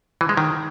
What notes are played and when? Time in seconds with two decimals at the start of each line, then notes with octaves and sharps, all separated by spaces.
0.21 E3
0.29 G#3
0.37 D#3